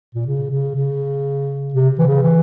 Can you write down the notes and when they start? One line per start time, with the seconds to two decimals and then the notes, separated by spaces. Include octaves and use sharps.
0.15 A#2
0.27 C#3
0.51 C#3
0.75 C#3
1.74 C3
1.99 E3
2.06 C#3
2.23 E3